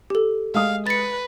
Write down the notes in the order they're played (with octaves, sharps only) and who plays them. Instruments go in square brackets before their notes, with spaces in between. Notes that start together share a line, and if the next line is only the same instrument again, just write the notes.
[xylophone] G4 A4
[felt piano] G#3 D#6 [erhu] F5
[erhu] B4 [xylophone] A6 C#7